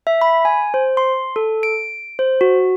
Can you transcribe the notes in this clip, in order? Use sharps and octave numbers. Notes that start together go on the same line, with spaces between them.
E5
B5
G#5
C5
C6
A4
D7
C5
F#4